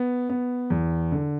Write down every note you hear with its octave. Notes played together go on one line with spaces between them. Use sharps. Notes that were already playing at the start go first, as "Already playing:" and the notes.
Already playing: B3
B3
E2
D3